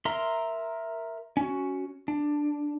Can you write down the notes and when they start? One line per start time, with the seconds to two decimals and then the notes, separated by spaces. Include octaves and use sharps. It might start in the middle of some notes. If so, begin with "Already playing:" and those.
0.05 A#4 E5 A#5 C6
1.37 C#4 F#4
2.08 D4